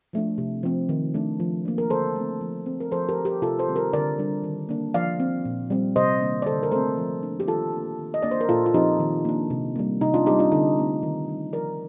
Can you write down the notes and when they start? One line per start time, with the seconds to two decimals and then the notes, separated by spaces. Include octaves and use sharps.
0.13 F3 A3 D4
0.38 C3
0.63 F3 C4
0.89 D#3
1.14 A3 D4
1.40 F3
1.65 A#3 D4
1.78 A#4
1.90 D3 A4 C5
2.16 A3 C4
2.41 F3
2.66 C4
2.80 A#4
2.91 F3 A4 C5
3.09 G4 A#4
3.18 C4
3.25 G4 A#4
3.42 C3 F4 A4
3.59 A4 C5
3.68 D#3 G3 C4
3.76 G4 A#4
3.93 D3 A#4 D5
4.18 G3 D4
4.44 D#3
4.69 A#3 D4
4.94 F3 D5 F5
5.20 C4
5.45 A#2
5.70 G3 C4
5.96 C3 C5 D#5
6.21 D#3 A#3 D4
6.42 D5
6.46 D3 A4 C5
6.63 A#4
6.72 A3 C4 A4 C5
6.98 F3
7.23 A#3 D4
7.40 G4
7.48 D#3 F4 A4
7.73 A#3 D4
7.99 D#3
8.14 D#5
8.22 A#3 D4 D5
8.31 C5
8.41 A#4
8.49 A#2 F4 A4
8.66 F4
8.74 F3 C4 D#4 G4
9.00 D#3
9.25 A#3 D4
9.50 C3
9.76 G3 A#3
10.01 C3 D#4
10.14 D4 F4
10.26 G3 C4 D#4 G4
10.39 D4 F4
10.52 D3 D#4
10.77 A3 C4
11.03 D#3
11.28 G3 D4
11.53 F3 A#4 D5